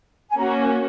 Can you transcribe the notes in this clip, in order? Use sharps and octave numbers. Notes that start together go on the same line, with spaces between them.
G#5
A#3 C#4 F#4 A#5
G#5